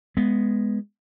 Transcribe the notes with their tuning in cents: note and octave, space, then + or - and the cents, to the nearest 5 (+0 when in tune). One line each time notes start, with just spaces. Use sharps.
G#3 +0 B3 +0